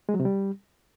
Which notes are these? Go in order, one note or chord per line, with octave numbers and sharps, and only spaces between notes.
G#3
F#3
C3
G3